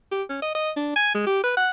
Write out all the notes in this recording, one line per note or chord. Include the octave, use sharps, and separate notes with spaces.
G4
C#4
D#5
D#5
D4
G#5
G#3
G4
B4
F#5